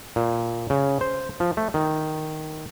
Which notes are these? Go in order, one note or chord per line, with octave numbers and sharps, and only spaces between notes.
A#2
C#3
C5
F3
A3
D#3